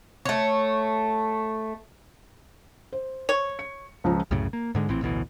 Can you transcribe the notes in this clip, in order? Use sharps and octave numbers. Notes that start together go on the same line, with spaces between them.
A3 C#5
C5
C#5
C#7
C#2 F3 A#5
C2 F#2 A2 C#3
A#3
G#2 D3 G#3
A#1 A2 E3 C4
A1 D2 B2 E3